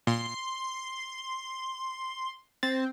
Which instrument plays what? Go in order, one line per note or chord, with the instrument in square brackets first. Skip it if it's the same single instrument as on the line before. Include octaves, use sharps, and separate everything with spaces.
[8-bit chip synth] A#2 [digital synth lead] C6
[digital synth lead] C4 [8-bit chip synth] A6